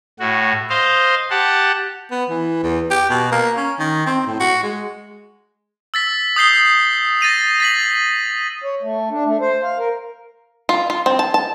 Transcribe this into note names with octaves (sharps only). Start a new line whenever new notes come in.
A2 F#4
C5 D#5 F5
G4 F#5 A5
B3
E3
E2
G4
B2
A#3
C#4
D#3
C4
A2
F#4
G#3
E6 A6 B6
D#6 G6 C7 G7
A6 A#6 D#7 F7
A6 B6 F#7
C#5
A3
D4
A3
C5
F5
A#4
F4
F4
C4
A5
A5